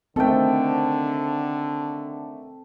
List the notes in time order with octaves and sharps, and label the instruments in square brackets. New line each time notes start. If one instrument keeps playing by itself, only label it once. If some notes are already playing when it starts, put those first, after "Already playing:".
[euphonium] D3 [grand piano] D#3 A3 [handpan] C4 [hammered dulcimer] A4 G5